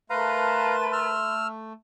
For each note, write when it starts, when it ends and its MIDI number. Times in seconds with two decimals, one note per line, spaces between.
0.10 1.73 57
0.10 1.15 70
0.10 1.15 71
0.10 0.76 77
0.10 1.15 81
0.10 0.76 82
0.10 1.34 84
0.93 1.47 88
0.93 1.47 89